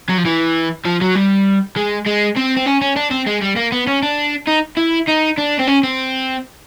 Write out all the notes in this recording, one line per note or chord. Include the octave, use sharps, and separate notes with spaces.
F#3
F3
E3
F3
F#3
G3
G#3
G#3
C4
C4
C#4
C#4
D4
C4
G#3
G3
A#3
B3
C#4
D4
D#4
E4
D#4
D4
C4
C#4
C4